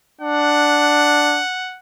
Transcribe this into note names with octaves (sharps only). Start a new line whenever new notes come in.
D4 F#5